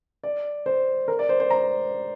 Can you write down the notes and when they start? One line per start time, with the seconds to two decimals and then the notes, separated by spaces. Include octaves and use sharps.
0.23 D5
0.66 C5
1.08 A#4
1.19 D5
1.29 C5
1.40 C5
1.50 A#5